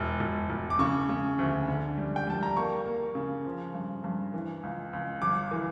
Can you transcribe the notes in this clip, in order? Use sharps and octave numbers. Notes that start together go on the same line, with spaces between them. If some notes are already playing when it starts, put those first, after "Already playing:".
Already playing: E1 E4
E1
E1
D6
C#3 C#6
C#3
D2
D3
G3
G5
G3 A5
A#5
A#3 C#6
A#3
C#3
F3
G2
G2
E3
C#2
C#2
G1 D6
E3